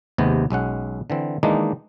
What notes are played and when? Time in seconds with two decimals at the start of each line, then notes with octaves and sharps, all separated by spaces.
0.18 D#2 C3 G#3 B3
0.50 B1 G#3 C#4 F#5
1.10 D3 E3 C4
1.43 D#3 E3 G#3 A#3 D4 D#4